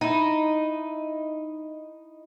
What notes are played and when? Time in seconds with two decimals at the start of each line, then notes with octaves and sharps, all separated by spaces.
0.01 D#4 E4